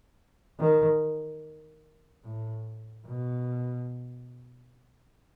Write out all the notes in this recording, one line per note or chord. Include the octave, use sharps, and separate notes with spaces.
D#3
A2
B2